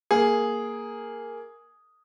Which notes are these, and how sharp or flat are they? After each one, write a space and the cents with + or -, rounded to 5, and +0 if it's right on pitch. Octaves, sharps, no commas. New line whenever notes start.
A#3 -5 G#4 +0